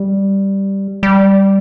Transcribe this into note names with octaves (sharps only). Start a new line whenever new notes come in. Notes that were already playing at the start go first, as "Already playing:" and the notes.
Already playing: G3
G3